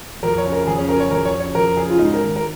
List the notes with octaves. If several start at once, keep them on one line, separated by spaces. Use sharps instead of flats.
F2 A#4
C#5
C#3
A#4
F2 G#4
C#4
C#3 A#4
C#5
F2 A#4
C#5
C#3
C#5
F2 A#4
C#3 G#4
F4
G#2 D#4
A#4
D#3
A#4